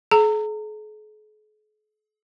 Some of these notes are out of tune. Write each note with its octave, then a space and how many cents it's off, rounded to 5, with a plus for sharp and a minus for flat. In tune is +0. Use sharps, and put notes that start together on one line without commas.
G#4 +45 A#5 -30